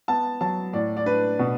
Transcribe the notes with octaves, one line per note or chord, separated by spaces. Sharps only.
B3 A5
F#3 A5
A2 D5
D5
D4 B4
B2